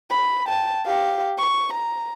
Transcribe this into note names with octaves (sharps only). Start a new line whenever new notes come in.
B5
G5 A5
G4 F5
C#6
A#5